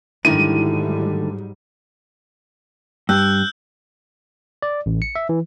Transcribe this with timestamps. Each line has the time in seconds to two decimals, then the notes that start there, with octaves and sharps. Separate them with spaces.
0.25 D2 G#2 D3 D#3 F#3 G3 E4 D#7
3.09 G2 E6 F#6 G6
4.62 D5
4.86 A1
5.02 C#7
5.16 E5
5.29 E3